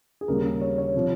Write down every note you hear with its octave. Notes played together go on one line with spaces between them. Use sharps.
G#4
D#2 C#3 G3 A#4
C#5
C#5
C3 F3